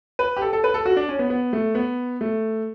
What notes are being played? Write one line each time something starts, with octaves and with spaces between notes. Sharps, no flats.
B4
G4
A4
A4
B4
A4
F#4
D4
C#4
B3
B3
A3
B3
A3